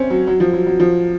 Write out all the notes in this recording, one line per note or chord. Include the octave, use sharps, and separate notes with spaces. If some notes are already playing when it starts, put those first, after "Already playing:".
Already playing: C4 C#4
F#3
F#3
F3
F#3
F#3
F3